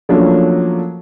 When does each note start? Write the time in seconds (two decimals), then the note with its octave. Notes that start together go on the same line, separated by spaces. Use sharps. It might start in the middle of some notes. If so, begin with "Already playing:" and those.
0.09 F3 F#3 A3 A#3 C#4 D4